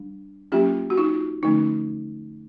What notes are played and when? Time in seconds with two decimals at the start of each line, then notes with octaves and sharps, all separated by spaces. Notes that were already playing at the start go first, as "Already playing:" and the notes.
Already playing: G3 D4
0.52 F#3 A#3 C#4 F4 G4
0.90 F#4
0.97 D#4 F4
1.43 D3 F3 A3 C#4 D#4